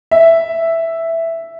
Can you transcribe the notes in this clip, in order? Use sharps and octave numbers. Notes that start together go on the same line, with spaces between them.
E5